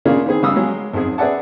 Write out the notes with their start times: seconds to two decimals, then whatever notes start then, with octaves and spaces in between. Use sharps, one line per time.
0.05 C#3 A#3 D4 F4 G#4
0.26 D#3 B3 C4 G#4
0.43 C#3 G3 D#4 F5 D#6 E6
0.56 F#3 G#3
0.94 G#1 F2 G#4
1.18 G#4 B4 D5 E5 F#5 A5